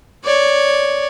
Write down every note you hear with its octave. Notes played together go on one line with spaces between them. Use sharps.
C#5 D5